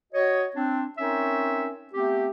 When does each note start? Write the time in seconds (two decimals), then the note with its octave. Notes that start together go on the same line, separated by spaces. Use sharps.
0.13 F#4 C#5 D#5
0.56 C4 D4
0.98 C4 C#4 D#4 A#4 C#5 E5
1.93 A3 B3 C4 G4